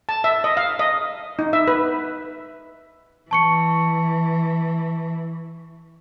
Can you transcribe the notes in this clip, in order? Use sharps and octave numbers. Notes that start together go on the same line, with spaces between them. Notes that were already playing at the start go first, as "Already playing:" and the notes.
A5
E5
D#5
F5
D#5
D#4
E5
B4
E3 A5 C#6 C#7